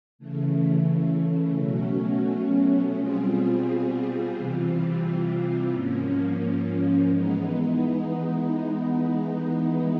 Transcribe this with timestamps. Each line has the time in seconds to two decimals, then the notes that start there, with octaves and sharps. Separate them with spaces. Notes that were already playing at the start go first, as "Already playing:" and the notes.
0.19 C#3 E3 A3
1.56 B2 F#3 A3 C#4
2.95 B2 G3 C4 F4 G#4
4.33 C3 E3 G3 C4 F4
5.71 G#2 F3 A#3 C#4
7.08 E3 G#3 B3 D#4